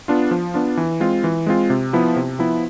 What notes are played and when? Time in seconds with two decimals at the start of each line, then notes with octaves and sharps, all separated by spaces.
0.08 B3 D4 F4
0.31 F3
0.54 B3 D4 F4
0.77 E3
1.00 G#3 C4 F4
1.24 E3
1.46 G#3 C4 F4
1.70 C3
1.93 F3 B3 E4
2.16 C3
2.39 F3 B3 E4